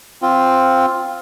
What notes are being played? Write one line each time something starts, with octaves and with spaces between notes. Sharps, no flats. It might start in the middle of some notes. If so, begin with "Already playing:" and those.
C4 F4